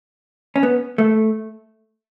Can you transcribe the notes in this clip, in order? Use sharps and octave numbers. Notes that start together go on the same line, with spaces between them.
C#4
B3
A3